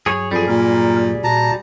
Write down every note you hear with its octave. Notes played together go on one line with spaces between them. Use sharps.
G2 F#3 G#4 C#5
F2 G3 G#4
A#2 A#4
A#2 F#4 A5 A#5